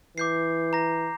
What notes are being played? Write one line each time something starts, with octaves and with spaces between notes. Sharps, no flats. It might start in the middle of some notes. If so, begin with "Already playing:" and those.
E3 D6 G6 C7
A#5 A#6